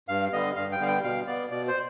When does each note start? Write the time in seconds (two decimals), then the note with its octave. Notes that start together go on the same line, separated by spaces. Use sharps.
0.08 G2 F5
0.32 D3 G3 B3 D#5
0.56 G2 F5
0.72 G5
0.80 D3 G3 B3 F5
0.88 G5
1.03 B2 F5
1.27 B3 D5
1.51 B2 D5
1.68 C5